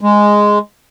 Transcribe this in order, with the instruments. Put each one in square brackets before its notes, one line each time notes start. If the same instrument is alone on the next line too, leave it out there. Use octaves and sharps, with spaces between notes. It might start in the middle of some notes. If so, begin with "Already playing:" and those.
[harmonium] G#3